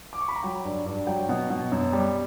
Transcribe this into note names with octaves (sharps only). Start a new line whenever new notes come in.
D6
C#6
B5
A#5
F#3 G5
G2
G2
F#3 G5
B2
B2
F#2
G3